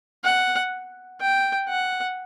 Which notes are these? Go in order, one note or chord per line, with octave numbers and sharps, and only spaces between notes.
F#5
G5
F#5